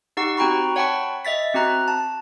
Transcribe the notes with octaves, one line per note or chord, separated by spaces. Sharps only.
D#4 G4 F#5 C#6
C4 F#4 G5 A#5 B5 C#6
C#5 F#5 G5 A5 B5 C#6
D#5 E5 A6 B6
C4 F#4 A#5 F#6
A5